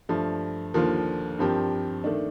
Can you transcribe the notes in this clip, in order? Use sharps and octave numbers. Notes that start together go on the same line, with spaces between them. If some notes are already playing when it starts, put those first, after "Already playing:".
G2 F3 A3
D#2 D3 F3 A#3 F4
G2 F3 C4 G4 A#4
D#3 A3 D4